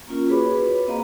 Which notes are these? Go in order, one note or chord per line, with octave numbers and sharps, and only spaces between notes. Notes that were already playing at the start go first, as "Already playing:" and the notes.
A#3 C#4 F4 A#4
F#4 G#4 B4 C#5 B5 D6
B4
A#3 C4 C5 D#5 F5 A#5